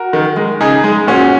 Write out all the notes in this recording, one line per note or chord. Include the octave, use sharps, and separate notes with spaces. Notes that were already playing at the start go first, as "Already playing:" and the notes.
Already playing: F#4 A#4
D#3
G#3
C#3 D#4 G#4
G#3
A#2 C#4 F#4